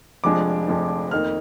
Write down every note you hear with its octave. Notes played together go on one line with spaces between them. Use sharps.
F1 F2 F3 G#3 D4 D6
F1 F2 F3 G#3 D4
F2 D#3 A#3 D#4 F6